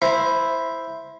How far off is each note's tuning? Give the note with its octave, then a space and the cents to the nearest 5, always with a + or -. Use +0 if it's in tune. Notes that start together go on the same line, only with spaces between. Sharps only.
E4 +0 C5 +0 A#5 +40